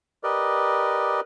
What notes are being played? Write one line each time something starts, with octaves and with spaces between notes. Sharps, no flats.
G4 A#4 B4 D5 D#5